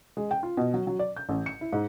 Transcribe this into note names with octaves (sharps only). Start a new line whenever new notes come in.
G#3
G5
F4
B2
F#3
F#3
D5
G6
A1
C#7
E4
G#2